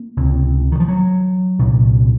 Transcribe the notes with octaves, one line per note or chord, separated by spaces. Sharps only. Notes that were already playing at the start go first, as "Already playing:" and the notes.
Already playing: A#3
C#2 C3
D#3
F3
F#3
C2 A#2